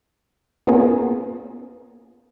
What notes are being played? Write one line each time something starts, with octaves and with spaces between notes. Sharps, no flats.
A#3 B3 C#4 F4 G#4 A#4